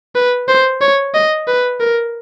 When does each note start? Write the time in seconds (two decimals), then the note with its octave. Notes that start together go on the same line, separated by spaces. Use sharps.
0.15 B4
0.48 C5
0.81 C#5
1.14 D#5
1.48 B4
1.80 A#4